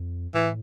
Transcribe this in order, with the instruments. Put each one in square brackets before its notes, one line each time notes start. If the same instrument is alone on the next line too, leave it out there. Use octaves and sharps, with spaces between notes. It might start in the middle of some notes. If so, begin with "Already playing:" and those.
Already playing: [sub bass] F2
[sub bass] A2 [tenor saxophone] E3